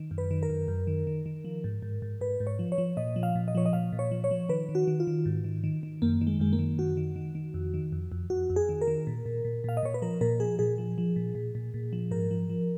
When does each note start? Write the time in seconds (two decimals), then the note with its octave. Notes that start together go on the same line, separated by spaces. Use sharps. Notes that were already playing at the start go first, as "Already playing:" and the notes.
Already playing: D#3
0.11 F#2
0.18 B4
0.31 D#3
0.43 A#4
0.50 F#2
0.68 F#2
0.87 D#3
1.07 D#3
1.26 D#3
1.45 F3
1.64 G#2
1.82 G#2
2.02 G#2
2.21 G#2 B4
2.40 G#2
2.47 C#5
2.59 F3
2.72 C#5
2.78 F3
2.97 A#2 D#5
3.16 F3
3.23 F5
3.35 A#2
3.48 D#5
3.55 F3 C#5
3.66 D#5
3.73 A#2 F5
3.92 A#2
3.99 C#5
4.11 F3
4.24 C#5
4.31 F3
4.49 D#3 B4
4.69 D#3
4.75 F#4
4.87 D#3
5.00 F4
5.07 D#3
5.26 G#2
5.44 D#3
5.64 D#3
5.83 D#3
6.02 F#2 A#3
6.21 D#3
6.27 G#3
6.40 F#2 G#3
6.53 A#3
6.59 D#3
6.78 F#2 F#4
6.97 D#3
7.16 D#3
7.35 D#3
7.54 F2
7.74 D#3
7.92 F2
8.12 F2
8.30 F2 F#4
8.50 F2
8.56 G#4
8.69 D#3
8.81 A#4
8.87 D#3
9.07 A#2
9.26 A#2
9.45 A#2
9.64 A#2 F5
9.77 D#5
9.83 A#2 C#5
9.94 B4
10.02 F3 A#4
10.21 A#2 A#4
10.40 F3 G#4
10.59 A#2 G#4
10.78 F3
10.98 F3
11.16 A#2
11.35 A#2
11.55 A#2
11.74 A#2
11.93 F3
12.11 G#2 A#4
12.31 F3
12.50 F3